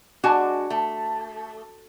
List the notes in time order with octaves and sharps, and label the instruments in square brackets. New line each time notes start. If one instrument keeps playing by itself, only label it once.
[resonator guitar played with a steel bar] G#3 D4 F#4 G#5
A3